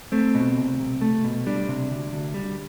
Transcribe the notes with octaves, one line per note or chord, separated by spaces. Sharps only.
A3 C4
B2
C2
C2
A3
B2
G3 D4
C3
D2
D2
G3